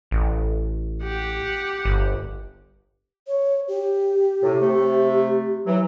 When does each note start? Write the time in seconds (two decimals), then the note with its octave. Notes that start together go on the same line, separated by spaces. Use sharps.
0.11 A1
1.03 G4 F#5
1.85 G1
3.27 C#5
3.68 G4
4.43 A2 C3
4.61 C3 A3
5.67 E3 F#3